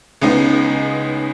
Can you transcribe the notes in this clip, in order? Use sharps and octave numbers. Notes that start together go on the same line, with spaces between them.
C#2 C#3 G#3 B3 D#4